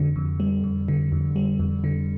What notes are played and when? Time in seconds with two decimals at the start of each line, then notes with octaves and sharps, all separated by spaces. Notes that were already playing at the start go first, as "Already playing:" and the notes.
Already playing: F2 D3
0.16 F2
0.40 G3
0.64 F2
0.88 D3
1.12 F2
1.36 G3
1.59 F2
1.84 D3